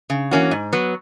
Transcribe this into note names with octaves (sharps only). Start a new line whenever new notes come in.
C#3
E3 A#3 C#4 F#4
G#2
F#3 B3